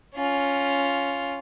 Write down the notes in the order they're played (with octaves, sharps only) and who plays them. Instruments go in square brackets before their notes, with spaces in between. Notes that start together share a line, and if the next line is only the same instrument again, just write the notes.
[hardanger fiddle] C#4 F4